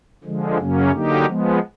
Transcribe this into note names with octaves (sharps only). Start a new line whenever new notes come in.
D3 F3 G#3
F#2 C#3 F#3 A#3 C#4
D3 F#3 A#3 D#4 G4
F3 G#3 B3